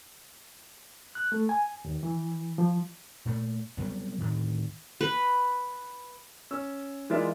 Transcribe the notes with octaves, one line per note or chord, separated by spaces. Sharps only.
F#6
A3
G#5
D#2
E3
F3
A#2 A3
C3 F#3 G3 B3
D2 A2 D#3
B4
C#4 E6
E3 G#3 A#3 F4 D5 E5